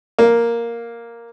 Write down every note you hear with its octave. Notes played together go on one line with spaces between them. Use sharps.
A#3